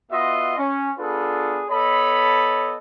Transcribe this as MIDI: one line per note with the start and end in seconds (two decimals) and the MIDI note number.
0.11 0.55 59
0.11 0.55 65
0.11 0.55 66
0.11 0.55 75
0.11 0.55 76
0.11 0.55 84
0.57 0.90 61
0.98 1.64 59
0.98 1.64 62
0.98 1.64 65
0.98 1.64 68
0.98 1.64 69
0.98 1.64 71
1.70 2.76 59
1.70 2.76 69
1.70 2.76 73
1.70 2.76 75
1.70 2.76 83